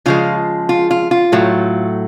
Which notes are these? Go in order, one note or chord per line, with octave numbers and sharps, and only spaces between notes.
C#3 F3 G#3 F4
F4
F4
F4
A2 F#3 A3